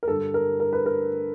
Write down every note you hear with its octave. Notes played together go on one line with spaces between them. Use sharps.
A#4
G2 D3 G3 A4
A#4
A#4
B4
A#4